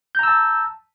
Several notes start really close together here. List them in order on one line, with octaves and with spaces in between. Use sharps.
G6 A#5 E6 A5